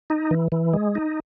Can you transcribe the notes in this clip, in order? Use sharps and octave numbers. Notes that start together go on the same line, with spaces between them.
D#4
E3
E3
G#3
D#4